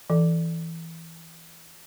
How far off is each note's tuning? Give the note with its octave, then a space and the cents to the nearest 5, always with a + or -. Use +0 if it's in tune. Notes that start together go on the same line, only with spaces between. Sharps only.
E3 +0 A4 +0